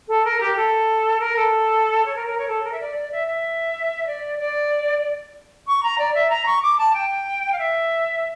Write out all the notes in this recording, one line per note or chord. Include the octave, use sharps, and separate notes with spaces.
A4
A#4
G4
A4
A#4
A4
C#5
A#4
A#4
C#5
A4
A#4
E5
D5
D5
E5
E5
D5
D5
C#6
A#5
D5
E5
A#5
C#6
D6
A5
G5
F5
E5